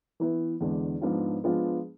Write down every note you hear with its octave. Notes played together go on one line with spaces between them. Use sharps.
E3 B3 E4 B4
E2 D3 G#3 D4
G#2 F3 B3 D4 F4
F3 G#3 B3 D4 F4